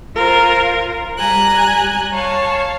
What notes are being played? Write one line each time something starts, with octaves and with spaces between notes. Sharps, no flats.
F4 A#4 C5 F5
G3 G#5 A#5 F#6
C#5 F5 A5